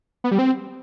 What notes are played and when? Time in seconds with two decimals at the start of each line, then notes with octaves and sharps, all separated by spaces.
0.24 B3
0.31 G3
0.39 C4